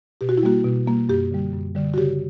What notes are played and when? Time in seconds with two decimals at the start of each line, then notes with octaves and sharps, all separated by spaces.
0.21 B2 G4
0.29 F#4
0.37 E4
0.43 G3 A#3 F#4
0.65 B2
0.87 G3 A#3
1.09 F#2 G4
1.31 D3 G3
1.53 F#2
1.75 D3 G3
1.94 F#4
1.98 C#3 G4